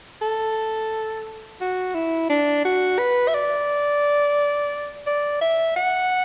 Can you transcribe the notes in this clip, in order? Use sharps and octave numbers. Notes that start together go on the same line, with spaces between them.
A4
F#4
E4
D4
F#4
B4
E5
D5
D5
E5
F#5